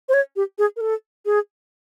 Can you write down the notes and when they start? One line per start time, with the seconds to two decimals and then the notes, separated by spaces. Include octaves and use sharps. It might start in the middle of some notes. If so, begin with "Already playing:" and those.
0.09 C5
0.14 C#5
0.36 G4
0.58 G#4
0.76 A#4
0.81 A4
1.26 G#4